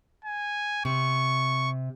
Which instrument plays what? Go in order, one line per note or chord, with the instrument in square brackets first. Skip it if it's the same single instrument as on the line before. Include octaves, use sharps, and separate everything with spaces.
[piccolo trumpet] G#5
[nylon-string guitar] C3 [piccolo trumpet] C#6